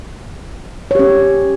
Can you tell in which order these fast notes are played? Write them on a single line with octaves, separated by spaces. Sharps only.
C#5 G4 C#4